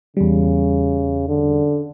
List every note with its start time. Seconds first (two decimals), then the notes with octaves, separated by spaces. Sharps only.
0.17 E2 C#3 G3
1.28 D3